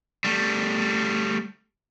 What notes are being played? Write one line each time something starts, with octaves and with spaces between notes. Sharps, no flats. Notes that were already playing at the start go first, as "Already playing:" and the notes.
G3 A3